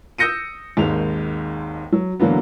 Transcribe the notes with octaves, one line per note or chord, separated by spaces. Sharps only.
D#6 E6 G6 A#6 C#7 D#7
G#1 D#2 G#3 F7
F#3
D3 E3 F#3 A#3 B3